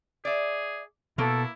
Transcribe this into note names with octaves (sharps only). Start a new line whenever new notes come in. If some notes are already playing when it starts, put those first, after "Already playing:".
G#4 D5 E5
B2 A#3 E4 A4